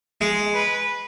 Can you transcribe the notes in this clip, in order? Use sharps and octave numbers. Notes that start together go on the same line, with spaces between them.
G#3
B4